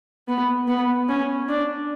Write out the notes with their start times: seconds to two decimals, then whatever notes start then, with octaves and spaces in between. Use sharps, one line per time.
0.28 B3
0.68 B3
1.09 C#4
1.49 D4